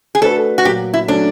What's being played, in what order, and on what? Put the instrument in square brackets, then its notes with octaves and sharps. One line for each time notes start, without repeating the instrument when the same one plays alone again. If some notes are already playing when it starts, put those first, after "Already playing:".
[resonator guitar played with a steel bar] G#4
[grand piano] A3 D4 F#4 B4 [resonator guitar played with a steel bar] A4
[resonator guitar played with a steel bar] F#4
[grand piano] A#2 F#3 A#3 [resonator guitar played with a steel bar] G4
[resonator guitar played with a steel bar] E4
[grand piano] F#3 A3 C#4 [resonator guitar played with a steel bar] D4